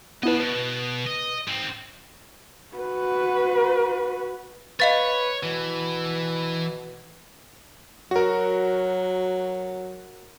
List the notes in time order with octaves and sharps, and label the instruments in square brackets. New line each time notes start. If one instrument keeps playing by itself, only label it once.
[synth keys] B3 E4 B4 [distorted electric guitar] D#5 A5
[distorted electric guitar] B2 [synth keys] B4
[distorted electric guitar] D#5
G#2 C4
[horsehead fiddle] F#4 B4
[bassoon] B4 [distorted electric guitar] C#5 [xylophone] D#5 F5 A6
[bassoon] B2 [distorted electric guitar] E3
[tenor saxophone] F#3 [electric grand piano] F#4 A#4